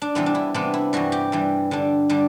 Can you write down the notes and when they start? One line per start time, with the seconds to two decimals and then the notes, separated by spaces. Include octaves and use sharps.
0.02 D4
0.15 C3 E3 G3 B3 E4
0.26 D4
0.35 E4
0.54 C3 E3 G3 B3 D4
0.74 E4
0.93 G2 E3 G3 F#4
1.12 G4
1.32 G2 E3 G3
1.71 D3 G3 D4
2.09 D3 G3 D4